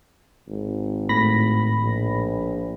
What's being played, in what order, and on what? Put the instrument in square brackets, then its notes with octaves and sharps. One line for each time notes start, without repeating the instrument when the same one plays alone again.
[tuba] G#1
[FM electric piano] A2 B5 A#6
[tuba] A#1